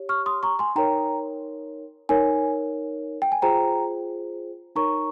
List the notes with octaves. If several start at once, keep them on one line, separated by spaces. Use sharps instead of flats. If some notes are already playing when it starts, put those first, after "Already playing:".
Already playing: G4 C#5
C#6 F6
C6 D#6
A#5 C#6
G#5 C6
D#4 A#4 C#5 G5 A#5
D#4 A#4 C#5 G#5
G5
G#5
F4 G#4 C5 G5 A#5
D#4 A#4 C#5 A#5 C#6